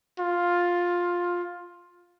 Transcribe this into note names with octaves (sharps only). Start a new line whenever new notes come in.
F4